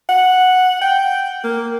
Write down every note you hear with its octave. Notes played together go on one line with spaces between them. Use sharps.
F#5
G5
A#3